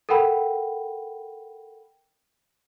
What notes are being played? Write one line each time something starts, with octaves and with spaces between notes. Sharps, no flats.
A4 A#4 F#5 G5 B5